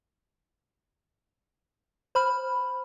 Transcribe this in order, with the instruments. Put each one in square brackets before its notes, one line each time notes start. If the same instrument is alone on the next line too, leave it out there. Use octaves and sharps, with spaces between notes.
[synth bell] C5 B5 F6